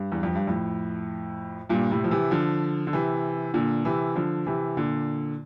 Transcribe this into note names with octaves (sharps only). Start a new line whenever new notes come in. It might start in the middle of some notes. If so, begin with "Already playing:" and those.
Already playing: G2
E2
F2
G2
F2 A2
G2 A#2
A2 C3
F3
C3 E3
D3 F3
D3
C3 E3
A#2 D3
C3 E3
D3 F3
C3 E3
A#2 D3